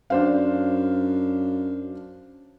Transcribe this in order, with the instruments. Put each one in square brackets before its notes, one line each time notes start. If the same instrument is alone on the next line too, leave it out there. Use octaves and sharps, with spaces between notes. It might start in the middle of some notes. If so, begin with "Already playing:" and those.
[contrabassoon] F#2 [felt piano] D4 C5 F5